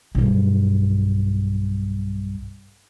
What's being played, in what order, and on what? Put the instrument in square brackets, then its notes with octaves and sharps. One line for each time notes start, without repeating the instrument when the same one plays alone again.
[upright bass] B1 G2